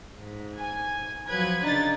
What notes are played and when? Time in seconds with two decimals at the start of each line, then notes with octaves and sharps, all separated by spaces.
0.16 G#2
0.58 G#5
1.29 F3 F#3 B4 G#6
1.64 C#3 D4 D#4 A6